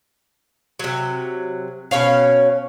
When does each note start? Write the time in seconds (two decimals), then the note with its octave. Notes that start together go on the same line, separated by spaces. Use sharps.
0.79 C3 F#3
1.91 B2 C#4 C#5 F5